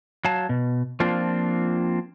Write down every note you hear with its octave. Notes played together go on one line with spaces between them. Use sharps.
F#3 F5 A5
B2
F3 A#3 C4 D4 F4